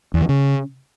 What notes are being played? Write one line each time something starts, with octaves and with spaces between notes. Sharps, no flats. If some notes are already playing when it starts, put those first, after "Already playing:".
E2
E3
C#3